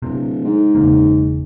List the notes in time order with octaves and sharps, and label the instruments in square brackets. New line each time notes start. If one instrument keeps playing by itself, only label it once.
[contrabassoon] D1 [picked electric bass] C3
[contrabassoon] G#2
[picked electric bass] E1 C#3 A#3